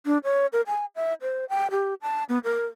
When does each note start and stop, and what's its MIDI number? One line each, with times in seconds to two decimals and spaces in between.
0.06 0.18 62
0.24 0.46 73
0.53 0.61 70
0.67 0.85 80
0.96 1.14 76
1.21 1.45 72
1.49 1.67 79
1.71 1.94 67
2.01 2.24 81
2.29 2.39 59
2.44 2.66 70